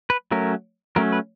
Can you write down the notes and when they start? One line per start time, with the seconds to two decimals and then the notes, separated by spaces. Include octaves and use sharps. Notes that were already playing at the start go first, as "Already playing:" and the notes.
0.10 B4
0.31 F#3 A3 C#4 A#4
0.96 F#3 A3 C#4 A#4
1.12 B4